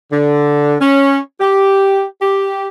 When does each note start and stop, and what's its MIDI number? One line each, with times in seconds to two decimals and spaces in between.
0.12 0.75 50
0.81 1.17 61
1.40 2.03 67
2.21 2.67 67